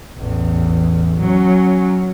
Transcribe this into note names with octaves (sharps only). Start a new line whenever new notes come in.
A1 E2
F#3 C#4